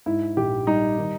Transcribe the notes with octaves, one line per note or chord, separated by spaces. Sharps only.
G#2 E4
A#1 G4
G3 D#4
D#3